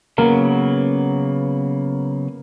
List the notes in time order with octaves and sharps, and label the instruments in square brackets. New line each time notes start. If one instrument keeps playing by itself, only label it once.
[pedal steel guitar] C#3 F#3 B3 [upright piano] A#3 A#4